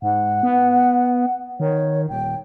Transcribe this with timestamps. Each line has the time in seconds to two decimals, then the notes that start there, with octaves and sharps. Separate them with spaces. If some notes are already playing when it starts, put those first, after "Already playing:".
0.02 G#2 F#5
0.43 B3
1.60 D#3 C#5
2.09 D#1 G5